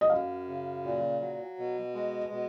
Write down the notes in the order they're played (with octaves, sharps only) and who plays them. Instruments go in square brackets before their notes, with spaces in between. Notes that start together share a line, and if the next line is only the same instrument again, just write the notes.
[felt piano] D#5
[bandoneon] F#2 [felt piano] F5
[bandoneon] C#3
A#2
F#3
B2
G#3
B2